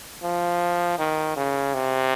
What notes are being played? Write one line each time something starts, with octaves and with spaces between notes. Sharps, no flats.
F3
D#3
C#3
C3